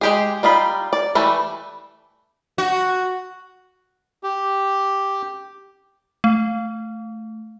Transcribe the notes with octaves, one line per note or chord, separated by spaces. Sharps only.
G#3 G4 G#4
G3 D#4 F4 B5
D5
E3 G3 A3
F#4
G4
A3